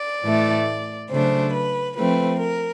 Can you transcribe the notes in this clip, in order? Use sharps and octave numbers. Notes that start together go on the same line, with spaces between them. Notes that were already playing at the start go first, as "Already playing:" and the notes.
Already playing: D5
A2 E3 A3
C#3 F#3 A3 D4 C5
B4
F3 A3 C4 B4
A#4